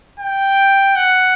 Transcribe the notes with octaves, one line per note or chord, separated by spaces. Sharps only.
G5
F#5